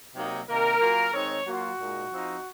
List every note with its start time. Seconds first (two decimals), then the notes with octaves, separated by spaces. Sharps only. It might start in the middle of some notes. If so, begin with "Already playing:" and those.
0.15 C3 F#3 A#3 D#4
0.48 C3 D#3 A#3 A#4
0.80 F#3 A#3 C#4 F4
1.13 D#3 G#3 C4 D#4 C#5
1.46 F#3 A#3 F4 F#4
1.78 A#2 G#3 D#4
2.11 F3 C4 D#4